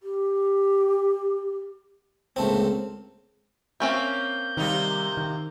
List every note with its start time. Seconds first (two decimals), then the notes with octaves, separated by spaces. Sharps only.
0.03 G4
2.36 C#2 A3 A#3 C4
3.80 A#3 C4 C#4 E5 G6
4.57 C3 D#3 G3 A#3 D#4
5.17 D#3